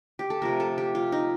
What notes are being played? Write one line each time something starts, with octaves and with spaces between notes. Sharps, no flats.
G4
A4
C3 F3 A3 A#4
A4
G4
F4
D#4